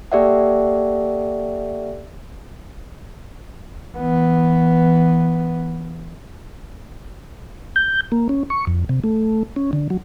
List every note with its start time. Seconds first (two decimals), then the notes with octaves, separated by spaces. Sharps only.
0.12 A#3 G4 A4 D5 E5 F#5
3.97 E3 B3
7.76 G6
8.12 A#3
8.29 C#4
8.50 C#6
8.67 F2
8.89 C3
9.04 A3
9.56 C#4
9.73 D3
9.90 F#3